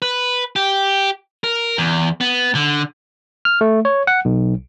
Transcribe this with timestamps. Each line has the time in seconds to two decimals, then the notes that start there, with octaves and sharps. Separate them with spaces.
0.02 B4
0.56 G4
1.44 A#4
1.78 E2
2.21 B3
2.55 D3
3.45 F6
3.61 A3
3.85 C#5
4.07 F#5
4.25 B1